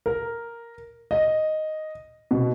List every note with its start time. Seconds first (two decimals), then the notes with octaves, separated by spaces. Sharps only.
0.06 A#4
1.11 D#5
2.31 B2